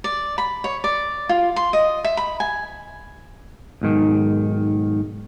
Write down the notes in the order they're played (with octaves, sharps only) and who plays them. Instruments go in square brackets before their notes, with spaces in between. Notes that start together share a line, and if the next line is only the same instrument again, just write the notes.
[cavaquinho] D5
B5
C#5
D5
F4
C6
D#5
E5
B5
G#5
[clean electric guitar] B1 G#2 D#3